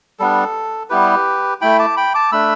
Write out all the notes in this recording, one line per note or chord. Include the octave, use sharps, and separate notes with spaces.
G3 B3 D4 A4
G3 B3 E4 G4 B4
A3 E4 G5 B5
A5 D6
G5 B5
A5 D6
A3 D4 B5 E6